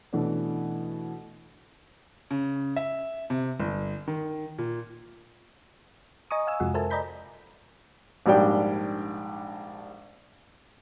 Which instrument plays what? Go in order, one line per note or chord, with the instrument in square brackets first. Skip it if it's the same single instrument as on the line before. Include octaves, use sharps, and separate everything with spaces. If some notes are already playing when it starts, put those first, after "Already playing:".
[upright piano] B2 E3 A3 C#4 D4
[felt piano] C#3
E5
C3
G1
D#3
A#2
[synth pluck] D#5 G#5 A#5 C#6 D#6
F5 G#5 E6
F2 C3 G#3 F4 F#4 F#5
A4 A#4 C5 E5 G#5 A5
D5 D#5 A#5 B5 G6 B6
[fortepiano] A#1 G#2 G3 D4 G5